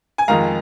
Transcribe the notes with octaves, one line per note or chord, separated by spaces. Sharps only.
G#5
F2 D#3 G#3 F5 A#5